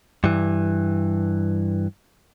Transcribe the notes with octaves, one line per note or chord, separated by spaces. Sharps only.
G2 E3